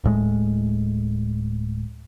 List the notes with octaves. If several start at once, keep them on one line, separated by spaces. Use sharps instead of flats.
D1 A2 G#3